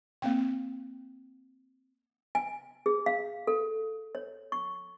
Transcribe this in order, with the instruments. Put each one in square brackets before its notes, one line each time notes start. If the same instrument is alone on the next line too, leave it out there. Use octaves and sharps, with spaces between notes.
[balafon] A#3 C4 G5
[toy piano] G#5
G#4
F5
A4
C#5
C#6